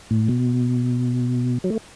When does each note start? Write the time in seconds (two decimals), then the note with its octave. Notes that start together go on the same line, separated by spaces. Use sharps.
0.11 A2
0.28 B2
1.64 F#3
1.70 A3